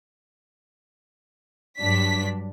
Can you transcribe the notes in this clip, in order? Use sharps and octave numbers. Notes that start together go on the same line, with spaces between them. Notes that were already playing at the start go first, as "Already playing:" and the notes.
G2 F#3 D4 B6